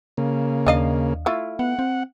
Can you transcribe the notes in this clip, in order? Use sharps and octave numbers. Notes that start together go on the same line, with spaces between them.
C#3 A#3
D#2 D4 D#5 F5
A3 E4 F4
B3 F#5
C4